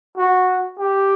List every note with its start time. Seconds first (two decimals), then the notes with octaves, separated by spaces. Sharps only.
0.18 F#4
0.79 G4